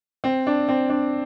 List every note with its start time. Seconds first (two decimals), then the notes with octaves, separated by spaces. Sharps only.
0.24 C4
0.47 D4
0.68 C4
0.89 D4